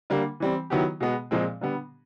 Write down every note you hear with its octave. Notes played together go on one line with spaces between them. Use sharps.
D3 G3 A#3
E3 G3 C4
D#3 F#3 B3 E4 G4
B2 G#3 B3
A#2 F3 G#3 C4
D3 G3 B3